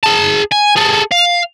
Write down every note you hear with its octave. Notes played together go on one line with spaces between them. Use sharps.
G#4 A5
G#5
G#4 A4
F5